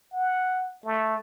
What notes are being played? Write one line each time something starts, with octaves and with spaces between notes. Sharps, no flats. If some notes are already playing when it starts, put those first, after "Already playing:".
F#5
A3